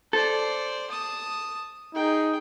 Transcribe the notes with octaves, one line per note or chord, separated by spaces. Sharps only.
A4 C5 D5
A5 D#6
D#4 G#4 G5